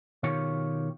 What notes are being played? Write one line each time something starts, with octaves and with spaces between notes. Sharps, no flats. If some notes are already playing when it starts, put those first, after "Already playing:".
B2 D#3 F4 G4 C#5